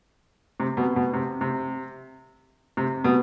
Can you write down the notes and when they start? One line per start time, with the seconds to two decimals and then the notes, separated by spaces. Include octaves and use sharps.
0.60 C3
0.77 B2
0.96 B2
1.13 C3
1.41 C3
2.77 C3
3.04 B2